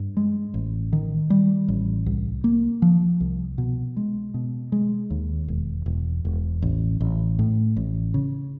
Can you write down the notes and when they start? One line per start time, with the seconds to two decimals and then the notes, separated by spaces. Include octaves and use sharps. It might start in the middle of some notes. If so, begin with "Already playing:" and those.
Already playing: G2
0.17 G#3
0.54 A1
0.93 D#3
1.30 G3
1.68 A1
2.06 C2
2.44 A#3
2.82 F3
3.21 C2
3.58 B2
3.97 G#3
4.34 B2
4.72 G#3
5.10 D#2
5.48 E1
5.86 E1
6.25 E1
6.62 A1
7.00 A1
7.39 A2
7.76 A1
8.14 C#3